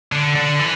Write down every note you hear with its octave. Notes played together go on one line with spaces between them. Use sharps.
D3
D3
E3